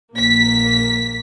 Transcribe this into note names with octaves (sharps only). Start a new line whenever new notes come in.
A#1 A#3 B6